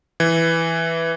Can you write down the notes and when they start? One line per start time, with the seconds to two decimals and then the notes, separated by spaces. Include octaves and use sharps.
0.20 E3